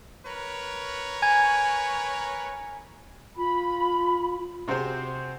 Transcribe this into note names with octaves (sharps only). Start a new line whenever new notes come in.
A#4 B4 C#5
G#5 G#6
F4 B5
C3 C4 F#4 G#4 C5